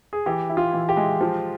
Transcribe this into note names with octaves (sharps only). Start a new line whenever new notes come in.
G#4
E3 G4
E4
F4
E3
G4
G#3
F3